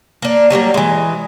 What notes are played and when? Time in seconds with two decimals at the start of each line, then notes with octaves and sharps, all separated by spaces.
0.22 A#3 D4
0.50 F#3 G3 A3 A#3
0.74 E3 G#3